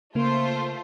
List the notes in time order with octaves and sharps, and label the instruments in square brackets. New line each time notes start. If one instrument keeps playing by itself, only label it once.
[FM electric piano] C#3 A#3 [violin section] A3 F4 C5